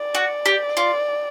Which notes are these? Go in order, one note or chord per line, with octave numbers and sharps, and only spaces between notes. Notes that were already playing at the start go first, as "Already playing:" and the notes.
Already playing: D5
F#4
G4
F4